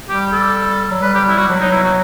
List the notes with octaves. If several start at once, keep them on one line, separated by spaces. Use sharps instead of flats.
G3 G4
A4
F#3
G3 B4
G4
E4
F#4
F#3
D#4
E4
F#4